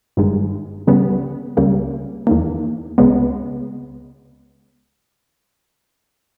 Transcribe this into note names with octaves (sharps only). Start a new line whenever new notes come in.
G1 G2 D#3 G#3
C#2 C#3 G3 B3
C#2 C#3 G3 A#3
E2 D#3 A#3
C#2 C#3 G#3 B3